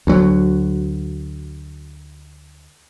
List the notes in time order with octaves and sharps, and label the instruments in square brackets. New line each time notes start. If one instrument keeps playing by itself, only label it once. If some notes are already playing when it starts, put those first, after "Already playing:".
[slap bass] D2 F#3